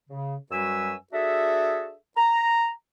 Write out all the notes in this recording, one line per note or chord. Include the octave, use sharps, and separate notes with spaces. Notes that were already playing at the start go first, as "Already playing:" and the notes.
C#3
F#2 G3 F#4 B4 G#5 E6
D4 F#4 G#4 A4 E5
A#5